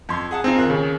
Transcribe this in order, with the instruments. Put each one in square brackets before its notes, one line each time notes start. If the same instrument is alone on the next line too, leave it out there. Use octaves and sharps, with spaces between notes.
[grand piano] F2 C6
G#4 F#5 A5
[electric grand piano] C4 D#4 F4
[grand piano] D#2 A#3 F#6
[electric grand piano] C#3